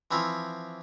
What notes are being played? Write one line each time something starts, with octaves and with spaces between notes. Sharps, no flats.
E3 F3 C4 E4